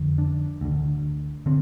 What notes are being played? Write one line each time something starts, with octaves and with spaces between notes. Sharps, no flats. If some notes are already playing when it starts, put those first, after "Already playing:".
Already playing: F2 D3
D4
D2 D3
D3 C4